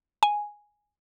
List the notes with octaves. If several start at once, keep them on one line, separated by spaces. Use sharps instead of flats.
G#5